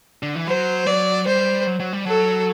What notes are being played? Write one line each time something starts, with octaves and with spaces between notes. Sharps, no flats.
D3
E3
F#3 C5
F#3 D5
G3 C5
F#3
F#3
G3
F#3 A4